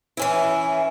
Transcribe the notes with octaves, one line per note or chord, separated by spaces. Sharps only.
E3 C#4 E4